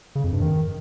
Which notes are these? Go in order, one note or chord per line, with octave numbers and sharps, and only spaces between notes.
C#3
F2
G2
D#3